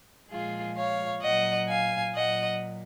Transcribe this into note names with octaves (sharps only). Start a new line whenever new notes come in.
A#2 F3 G#3 F4 G#4
C#5 F5
A#2 F#3 D#5 F#5
F5 G#5
A#2 F#3 D#5 F#5